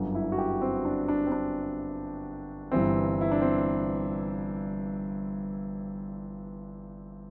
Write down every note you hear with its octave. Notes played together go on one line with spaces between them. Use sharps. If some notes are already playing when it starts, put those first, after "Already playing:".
Already playing: G1 F#2 D3
E4
F#4
G4
C4
D4
D4
C4
D4
G1 G2 E3 C4
E4
D4
C4